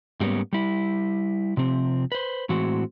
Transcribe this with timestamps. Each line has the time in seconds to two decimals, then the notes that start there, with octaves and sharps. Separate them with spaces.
0.20 G#2 G3 A#3 B3 C#4
0.53 G3 E4
1.57 C3 F3 C4
2.12 B4 C5
2.49 A2 E3 G#3 C4 F#4